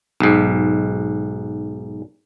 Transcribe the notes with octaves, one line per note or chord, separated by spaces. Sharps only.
B1 G#2